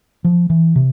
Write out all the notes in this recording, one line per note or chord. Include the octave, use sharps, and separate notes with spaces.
F3
E3
C3